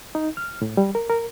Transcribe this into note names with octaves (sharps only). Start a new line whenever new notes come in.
D#4
F6
A2
G3
A#4
A#4